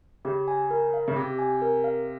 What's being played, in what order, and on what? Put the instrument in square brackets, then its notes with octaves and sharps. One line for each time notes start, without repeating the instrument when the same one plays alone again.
[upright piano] C#3 [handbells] G4
[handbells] G#5
A#4
F5
[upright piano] C#3
[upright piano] C3 [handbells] G4
[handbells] G#5
A#4
F5